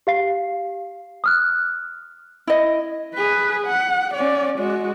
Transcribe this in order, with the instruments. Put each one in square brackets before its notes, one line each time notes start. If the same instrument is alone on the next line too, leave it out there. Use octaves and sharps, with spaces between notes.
[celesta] G4 F5 C7
D#6 F6 F#6
[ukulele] E4 D#5
[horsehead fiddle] G#4 B4
F#5
C#4 D5
G#3 F#4